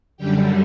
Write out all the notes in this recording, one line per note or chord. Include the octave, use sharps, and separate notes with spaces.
F#2 D3 G3 G4 G5